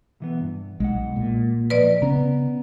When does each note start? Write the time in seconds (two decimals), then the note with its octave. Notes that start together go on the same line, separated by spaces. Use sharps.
0.20 B1 E3 B3
0.41 G2
0.80 B1 G#3 F#5
1.16 A#2
1.70 B1 F3 B4 D5 D#5
2.02 C#3 B3 C#4 A#5